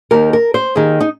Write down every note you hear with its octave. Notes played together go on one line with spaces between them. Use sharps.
D#2 D#3 A#4
A#4
C5
D#2 D#3 G#4
D#4